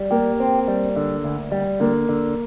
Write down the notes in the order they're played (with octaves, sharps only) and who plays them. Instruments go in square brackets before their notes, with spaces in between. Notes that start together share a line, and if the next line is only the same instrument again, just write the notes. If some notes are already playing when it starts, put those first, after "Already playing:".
Already playing: [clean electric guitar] G3
[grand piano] A#3 [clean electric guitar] G4
[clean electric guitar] C4
G3
D3
D2
G3
[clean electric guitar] D3 [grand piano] A#3
[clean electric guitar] D3